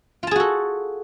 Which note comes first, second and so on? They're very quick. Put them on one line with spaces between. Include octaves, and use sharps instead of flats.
F4 A5 G#4 F#4 A4